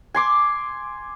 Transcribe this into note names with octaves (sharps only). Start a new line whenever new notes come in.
G#5 C6 D6